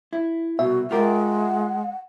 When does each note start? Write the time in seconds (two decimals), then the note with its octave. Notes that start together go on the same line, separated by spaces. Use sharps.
0.13 E4
0.59 C2 B2 F#4 E5
0.91 G#3 F4 G4 A#4 F#5